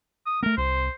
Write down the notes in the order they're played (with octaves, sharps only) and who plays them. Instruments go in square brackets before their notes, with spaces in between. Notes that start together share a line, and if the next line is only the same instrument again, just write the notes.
[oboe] D#6
[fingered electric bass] A3 B3 [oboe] A#4
[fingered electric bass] C2 [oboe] C5